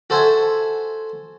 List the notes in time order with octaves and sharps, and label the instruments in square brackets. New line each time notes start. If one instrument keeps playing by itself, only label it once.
[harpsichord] F#4 A4 C5 E5 F#5 G#5